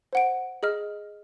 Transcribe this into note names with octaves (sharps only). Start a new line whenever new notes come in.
C5 F#5 D7
G#4 D#5 F6